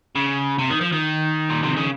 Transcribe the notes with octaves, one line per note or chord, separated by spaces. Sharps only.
C#3
C3
D#3
F3
D#3
A#2
C3
C#3